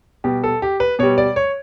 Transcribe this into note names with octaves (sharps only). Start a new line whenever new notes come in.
B2 G3 G4
A4
G4
B4
B2 G3 C#5
D5
C#5